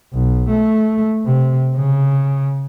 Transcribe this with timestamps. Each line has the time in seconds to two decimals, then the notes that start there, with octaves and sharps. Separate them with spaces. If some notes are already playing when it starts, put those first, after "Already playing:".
0.14 B1
0.50 A3
1.26 C3
1.76 C#3